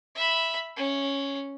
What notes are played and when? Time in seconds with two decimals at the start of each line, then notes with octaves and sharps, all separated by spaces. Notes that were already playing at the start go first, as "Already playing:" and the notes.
0.16 E5 B5
0.77 C#4